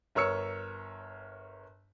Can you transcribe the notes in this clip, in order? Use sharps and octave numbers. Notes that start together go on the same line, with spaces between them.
G1 A#4 C#5 E6 C#7